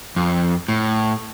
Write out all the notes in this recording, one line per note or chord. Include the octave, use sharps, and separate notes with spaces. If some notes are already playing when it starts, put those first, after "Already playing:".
F2
A2